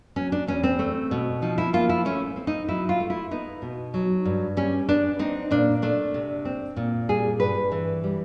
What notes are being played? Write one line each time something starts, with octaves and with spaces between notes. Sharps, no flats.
F#3 C#4
D4
E2 C#4
C4
A3
B2
F3 D#4
E4
A#3 F4
E4
A3 C#4
C4
D#4
F#3 E4
F4
A3
E4
B3 D#4
B2
F#3
G2
G3 C#4
B3 D4
C4 D#4
A#2 D4
A3 D4
C3
C4
A#2
G3 G#4
G2 B4
E3
G3